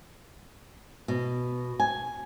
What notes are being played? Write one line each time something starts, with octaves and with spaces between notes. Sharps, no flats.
B2
G#5